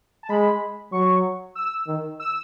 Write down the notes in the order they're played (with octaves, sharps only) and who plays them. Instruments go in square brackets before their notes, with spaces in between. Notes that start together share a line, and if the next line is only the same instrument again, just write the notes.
[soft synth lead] A5
[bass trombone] G#3 [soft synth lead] B5
[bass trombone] F#3 [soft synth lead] C#6
[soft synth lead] E6
[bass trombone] D#3
[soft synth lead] E6